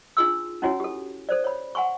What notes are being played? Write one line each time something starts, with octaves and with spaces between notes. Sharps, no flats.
D4 D#4 F4 G#4 C6 E6
C#4 D#4 E4 F#4 C#5 G#5
G4 A4
A4 C5 D5
C#5 B5
F#5 G#5 C6 C#6